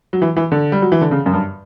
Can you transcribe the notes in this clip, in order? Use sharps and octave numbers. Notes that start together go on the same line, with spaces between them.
F#3
E3
E3
D3
G3
F#3
E3
D3
C#3
F#2
G2